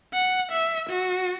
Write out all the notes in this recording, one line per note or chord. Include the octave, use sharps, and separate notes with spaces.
F#5
E5
F#4